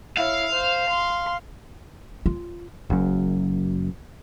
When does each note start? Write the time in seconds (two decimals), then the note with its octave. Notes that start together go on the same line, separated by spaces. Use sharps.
0.18 E4 C#5 F5
0.51 C5
0.89 C6
2.26 F4
2.90 F#1 F#2